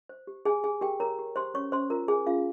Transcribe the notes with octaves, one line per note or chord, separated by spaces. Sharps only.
C5
G4
G4 G#4 G#5
G4 G#4 G#5
G4 A#4 G5
A#4 C#5 A#5
G4
G4 C5 C6
C#4 C#5 C#6
C#4 C5 C6
F4 A#4 A#5
G#4 C5 G#5
C#4 F4 F5